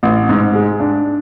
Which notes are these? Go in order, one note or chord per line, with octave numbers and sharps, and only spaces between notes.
A1
G#2
G#3
D4